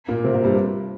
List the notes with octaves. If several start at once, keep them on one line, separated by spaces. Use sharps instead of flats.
A#2 A#3
C3 C4
A#2 A#3
G2 G3